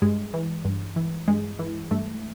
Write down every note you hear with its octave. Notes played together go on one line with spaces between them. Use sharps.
G2 G#3
E3
G2
E3
G2 G#3
E3
G2 A3